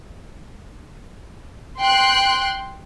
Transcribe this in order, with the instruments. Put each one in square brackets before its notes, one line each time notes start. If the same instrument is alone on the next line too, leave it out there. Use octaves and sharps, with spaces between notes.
[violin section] G5 C6 F#6